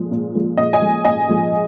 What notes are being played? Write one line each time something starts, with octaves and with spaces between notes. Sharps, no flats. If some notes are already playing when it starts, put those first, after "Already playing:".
Already playing: A#2 F3 G#3
A#2
F3 G#3
A#2 D#5
D#5 G#5
F3 G#3
A#2 D#5 G#5
F3 G#3